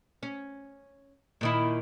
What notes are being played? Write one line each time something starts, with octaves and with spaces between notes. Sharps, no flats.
C#4
A#2 D#3 E4